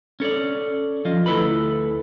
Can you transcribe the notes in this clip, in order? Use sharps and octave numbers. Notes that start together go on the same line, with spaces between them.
C#4 A4 C#5 D5
F3 F4 D#5
D2 E4 A4 B4 B5